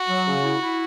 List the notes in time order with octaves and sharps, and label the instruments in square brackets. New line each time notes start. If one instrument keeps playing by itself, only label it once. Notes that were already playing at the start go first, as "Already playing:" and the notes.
Already playing: [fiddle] F#4
[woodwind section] F#3
C#3
E4
E4